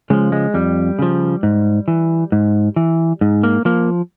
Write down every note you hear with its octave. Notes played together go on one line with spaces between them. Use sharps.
C#3 F3 G#3
G#3
F2 G3
C#3 F3
G#2
E3
G#2
E3
G#2
A#3
F3 A#3